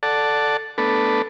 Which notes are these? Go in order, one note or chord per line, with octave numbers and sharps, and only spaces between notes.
A4 D5 F#5 A5
A3 B3 D4 A4 B4